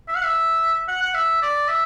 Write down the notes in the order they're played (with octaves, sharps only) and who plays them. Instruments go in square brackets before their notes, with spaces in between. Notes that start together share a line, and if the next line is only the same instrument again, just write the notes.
[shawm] E5
F#5
E5
F#5
F#5
E5
D5
E5